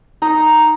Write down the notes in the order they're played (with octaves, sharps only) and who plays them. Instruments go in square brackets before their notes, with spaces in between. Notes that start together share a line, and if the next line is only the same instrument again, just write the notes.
[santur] D#4 A#5